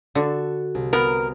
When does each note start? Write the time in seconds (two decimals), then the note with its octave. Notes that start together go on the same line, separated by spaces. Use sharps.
0.15 D3 F#4 A4
0.75 C2
0.93 B3 A#4